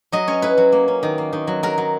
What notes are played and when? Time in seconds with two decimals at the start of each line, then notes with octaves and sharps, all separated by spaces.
0.12 F#3 D#5
0.27 C#4 C#5
0.42 E4 B4
0.58 F#3
0.72 A#3
0.88 C#4
1.03 D#3
1.18 A#3
1.33 D#3
1.47 F#3
1.63 F#3 A#4
1.78 F#3